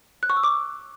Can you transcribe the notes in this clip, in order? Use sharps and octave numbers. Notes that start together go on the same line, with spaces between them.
F#6
C#6
E6
D6